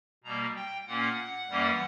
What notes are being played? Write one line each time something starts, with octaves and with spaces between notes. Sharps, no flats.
B2 G3 A#3 A#5
G5
A#2 A#3 C#4 F#5
F#2 E3 G3 A#3 C#4